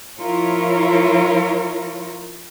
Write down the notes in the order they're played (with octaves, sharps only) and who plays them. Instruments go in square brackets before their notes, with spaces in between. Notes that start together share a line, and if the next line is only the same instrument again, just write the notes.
[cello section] F3 E4 F4 A#4 C#5